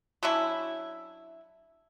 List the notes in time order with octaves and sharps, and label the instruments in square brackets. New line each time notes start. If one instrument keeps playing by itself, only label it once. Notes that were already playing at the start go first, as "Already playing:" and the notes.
[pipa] F#3 C#4 D4 E4